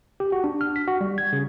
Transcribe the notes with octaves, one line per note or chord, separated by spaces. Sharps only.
G4
F#4
D4
F6
B6
F#4
G3
G#6
C#3